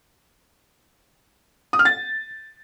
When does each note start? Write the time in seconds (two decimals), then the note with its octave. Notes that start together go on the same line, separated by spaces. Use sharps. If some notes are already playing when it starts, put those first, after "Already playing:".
1.73 D#6
1.79 F6
1.85 A6